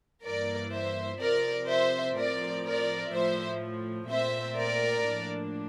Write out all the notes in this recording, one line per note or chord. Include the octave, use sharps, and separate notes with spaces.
G2 E3 A#3 A#4 D5
C5 E5
C3 F3 C4 A#4 D5
C5 E5
A2 F3 C4 A#4 D5
A#4 D5
A2 F3 A3 C5 E5
A#2 A3 C4 C5 E5
A#4 D5
A2 F3 A#3 D4